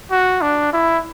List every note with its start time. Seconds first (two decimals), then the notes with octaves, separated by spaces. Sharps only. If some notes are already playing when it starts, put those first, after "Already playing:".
0.11 F#4
0.42 D4
0.73 E4